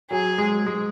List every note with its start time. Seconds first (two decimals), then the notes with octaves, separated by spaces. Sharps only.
0.11 F#3 G#4
0.38 G#3
0.66 G#3